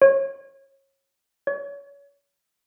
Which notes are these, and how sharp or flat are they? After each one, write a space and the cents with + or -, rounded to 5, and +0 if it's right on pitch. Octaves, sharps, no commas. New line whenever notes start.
C#5 -25
C#5 +30